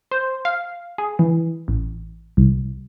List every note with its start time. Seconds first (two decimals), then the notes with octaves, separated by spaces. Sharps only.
0.12 C5
0.45 F5
0.98 G#4
1.19 E3
1.68 A1
2.37 C2